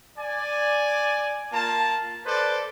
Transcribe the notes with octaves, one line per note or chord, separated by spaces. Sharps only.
D5 G#5
A#3 F4 A5
A4 B4 C5 D5